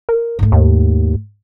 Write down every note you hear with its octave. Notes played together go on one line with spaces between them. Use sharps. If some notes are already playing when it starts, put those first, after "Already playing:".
A#4
G#2 A3
D#2